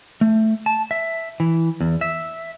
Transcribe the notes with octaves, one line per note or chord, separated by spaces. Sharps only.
A3
A5
E5
E3
E2
E5